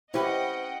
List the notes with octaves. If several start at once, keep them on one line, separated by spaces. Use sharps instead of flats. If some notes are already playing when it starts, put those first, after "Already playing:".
C#4 E4 G4 B4 C5 D#5 F#5 G5